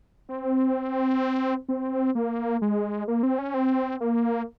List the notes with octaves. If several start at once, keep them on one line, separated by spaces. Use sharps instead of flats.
C4
C4
A#3
G#3
A#3
C4
C#4
C4
A#3